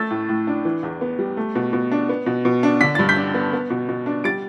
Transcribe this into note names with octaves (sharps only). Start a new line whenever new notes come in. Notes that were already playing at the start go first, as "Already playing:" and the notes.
Already playing: A3 E6 A6
A2
A2
D4
E3
E2
B3
G3
A3
B2
B2
D4
B3
B2
B2
D4
D3 B6
G2 A6
G6 B6
D4
B3
B3
B2
B2
D4
G3 A6 D7